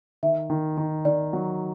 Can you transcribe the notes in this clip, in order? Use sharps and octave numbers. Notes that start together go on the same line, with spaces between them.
D#3 E5
D#3
D#3
D#3 D5
F#3